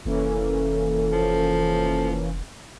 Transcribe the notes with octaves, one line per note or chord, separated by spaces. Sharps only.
F1 E3 A#3 C#4 A4
F3